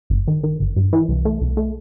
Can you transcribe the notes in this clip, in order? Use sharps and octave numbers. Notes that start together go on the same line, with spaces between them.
G1
D#3
D#3
G1
G2
E3
C2
A3
C2
A3